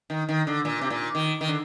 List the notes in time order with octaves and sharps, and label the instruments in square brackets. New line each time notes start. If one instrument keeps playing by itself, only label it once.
[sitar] D#3
D#3
D3
A#2
C3
A#2
D#3
D#3
D3